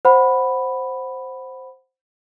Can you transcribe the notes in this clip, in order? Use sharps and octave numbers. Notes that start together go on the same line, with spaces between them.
C5 F#5 B5